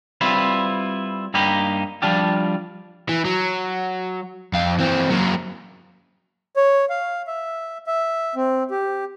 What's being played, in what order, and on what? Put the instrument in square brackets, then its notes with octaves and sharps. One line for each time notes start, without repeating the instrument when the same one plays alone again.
[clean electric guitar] G3 C4 E4 F4 B4
G2 A#3 D#4 G4 B5
F3 G3 D4 F4 G4
[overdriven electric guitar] E3
F#3
F2 F5
E3 C4
F#3 A#3
[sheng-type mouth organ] C#5
F5
E5
E5
C4
G4